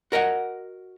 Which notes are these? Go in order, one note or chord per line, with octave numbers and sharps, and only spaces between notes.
F#4 A#4 D#5 F#5